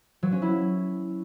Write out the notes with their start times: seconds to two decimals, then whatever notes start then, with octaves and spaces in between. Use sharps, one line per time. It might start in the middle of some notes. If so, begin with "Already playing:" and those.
0.23 F#3
0.32 C#4
0.42 E4